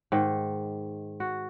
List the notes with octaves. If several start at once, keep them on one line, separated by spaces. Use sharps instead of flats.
G#2 D#3
F#4